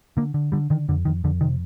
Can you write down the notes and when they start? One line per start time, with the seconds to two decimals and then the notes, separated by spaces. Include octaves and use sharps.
0.17 D3 A#3
0.34 D3
0.52 D3 G3
0.70 D3 D#3
0.88 F2 D3
1.05 F2 D#3
1.24 F2 D3
1.41 C3 D#3